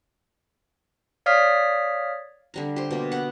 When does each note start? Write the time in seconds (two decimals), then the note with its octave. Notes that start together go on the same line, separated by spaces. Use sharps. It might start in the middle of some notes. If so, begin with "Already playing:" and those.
1.26 C#5 D5 F5 D#6 F6 B6
2.54 D3 G3 A#5
2.76 G4 C5
2.91 B2 A#3
3.12 B3 F#5